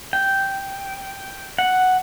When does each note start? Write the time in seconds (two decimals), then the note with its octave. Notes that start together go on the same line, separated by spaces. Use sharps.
0.13 G5
1.58 F#5